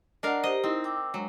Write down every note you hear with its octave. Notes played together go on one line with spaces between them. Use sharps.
D4 A#4 D#5 F5 F#5
G4 C5 D#5
C4 D#4 E4 D#5
G5 D6 E6
F#3 G#3 D4